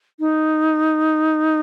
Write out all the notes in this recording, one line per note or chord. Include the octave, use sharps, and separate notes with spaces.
D#4